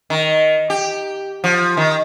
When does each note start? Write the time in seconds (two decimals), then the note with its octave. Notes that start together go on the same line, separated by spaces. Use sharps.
0.10 D#3
0.70 G4
1.44 F3
1.77 D#3